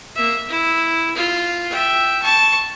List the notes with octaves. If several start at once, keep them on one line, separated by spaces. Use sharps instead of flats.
A#3 E5
E4
F4
E5 G5
A5 C#6